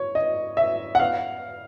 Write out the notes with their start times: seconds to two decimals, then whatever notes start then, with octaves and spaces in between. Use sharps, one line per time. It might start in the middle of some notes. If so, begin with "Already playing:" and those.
Already playing: C#5
0.15 D#5
0.57 E5
0.95 F#5
1.00 F5